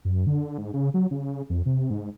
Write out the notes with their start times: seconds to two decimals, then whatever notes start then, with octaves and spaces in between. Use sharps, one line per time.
0.05 F#2
0.27 D3
0.58 G#2
0.74 C#3
0.94 F#3
1.11 C#3
1.50 F2
1.66 C3
1.90 G#2